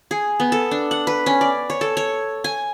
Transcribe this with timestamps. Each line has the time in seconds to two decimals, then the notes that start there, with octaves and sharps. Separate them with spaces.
0.11 G#4
0.40 B3
0.52 A4
0.71 D4
0.91 F#5
1.07 B4
1.26 C#4
1.41 D5
1.70 C#5
1.81 A4
1.97 C#5
2.44 G#5